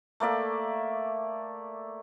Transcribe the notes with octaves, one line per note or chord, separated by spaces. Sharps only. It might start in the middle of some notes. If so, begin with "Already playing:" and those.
A3 A#3 D5 E5